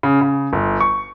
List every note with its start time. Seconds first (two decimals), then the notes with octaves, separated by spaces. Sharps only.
0.03 C#3
0.21 C#3
0.53 G1
0.80 C#6